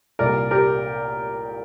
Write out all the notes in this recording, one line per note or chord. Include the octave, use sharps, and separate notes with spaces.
C2 A#2 G3 A#4 D5
G4 A#4